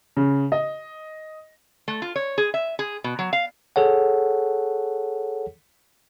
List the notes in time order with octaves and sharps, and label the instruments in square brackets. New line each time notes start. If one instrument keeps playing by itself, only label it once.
[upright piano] C#3
D#5
[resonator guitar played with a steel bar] A3
F4
C#5
G#4
E5
G#4
B2
F#3
F5
[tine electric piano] G#4 A4 C#5 F#5